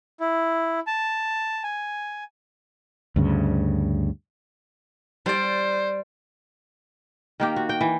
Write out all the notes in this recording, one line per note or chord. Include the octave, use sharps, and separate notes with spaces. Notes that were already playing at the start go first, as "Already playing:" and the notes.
E4
A5
G#5
D2 G2 C#3
G3 C5 D5
D#3 A#3 G4
F#4
G5
E3